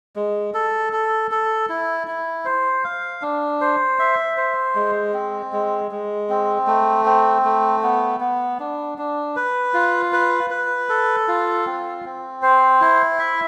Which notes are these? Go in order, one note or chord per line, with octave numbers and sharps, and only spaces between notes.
G#3
A4
A4
A4
E4
E4
C5
F5
D4
C5
E5
C5
G#3
C4
G#3
G#3
C4
A3
C4
A3
B3
B3
D4
D4
B4
F4
B4
B4
A4
F4
C4
C4
C5
E4
E5